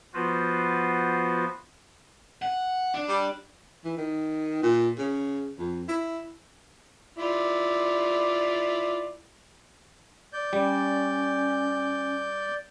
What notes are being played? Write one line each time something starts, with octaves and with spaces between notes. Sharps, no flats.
F3 B3 F4 F#4 B4 C5
F#5
D4
G3
E3
D#3
A#2
C#3
F2
E4
E4 F4 D5
D5 G6
G3 C#4